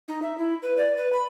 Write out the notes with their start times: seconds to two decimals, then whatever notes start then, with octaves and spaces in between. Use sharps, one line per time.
0.08 D#4
0.22 E5
0.38 E4
0.63 B4
0.77 D5
0.97 B4
1.13 B5